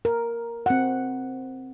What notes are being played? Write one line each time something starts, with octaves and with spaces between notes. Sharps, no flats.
A#4
C4 F#5